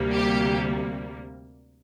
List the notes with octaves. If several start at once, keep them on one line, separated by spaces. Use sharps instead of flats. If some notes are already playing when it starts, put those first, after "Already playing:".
Already playing: D2 C3 G3 A#3
G4